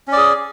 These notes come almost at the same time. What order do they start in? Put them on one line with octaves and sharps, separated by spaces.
C#4 D5 G#4